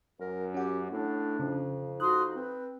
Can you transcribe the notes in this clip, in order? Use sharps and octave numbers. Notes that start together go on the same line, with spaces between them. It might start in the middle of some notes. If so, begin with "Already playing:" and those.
F#2 A#4
C#4 G4 F#5
A2 D4
F2 C#3
D#4 F#4 C6 D#6 F#6
C4 B4